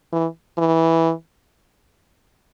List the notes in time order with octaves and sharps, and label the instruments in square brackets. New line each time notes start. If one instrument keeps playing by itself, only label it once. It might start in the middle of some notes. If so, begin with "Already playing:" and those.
[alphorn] E3
E3